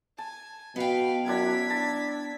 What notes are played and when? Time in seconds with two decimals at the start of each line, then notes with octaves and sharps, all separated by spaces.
0.18 G#5 A5
0.76 B2 B3 B4 F5 G5
1.26 F#2 D4 E4 A#4 G#6 B6
1.70 D4 A5